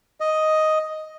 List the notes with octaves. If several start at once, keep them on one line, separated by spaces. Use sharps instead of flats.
D#5